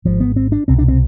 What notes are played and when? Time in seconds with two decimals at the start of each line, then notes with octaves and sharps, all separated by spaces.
0.05 G#1 G#2 F3
0.20 B3
0.36 C4
0.52 D4
0.68 C2 B2 C4
0.79 D4
0.88 C4